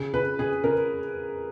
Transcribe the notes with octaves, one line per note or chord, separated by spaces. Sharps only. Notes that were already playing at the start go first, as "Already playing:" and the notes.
Already playing: C#3
C#3 B4
C#3 G#4
C#3 A#4